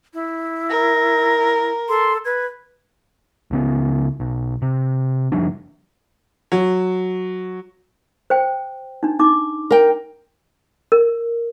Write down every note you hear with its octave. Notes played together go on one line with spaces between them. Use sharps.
E4
A#4 A#6
A4 C6
B4 G#6
C#2 C#3 B3
B1
C3
F#1 F3 G3 D4
F#3
C5 G5
D4 D#4
D#4 D6
A#4 G5
A#4